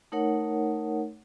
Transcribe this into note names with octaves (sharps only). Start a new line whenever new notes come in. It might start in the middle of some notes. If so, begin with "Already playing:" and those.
A3 D#4 A#4 C#5 F#5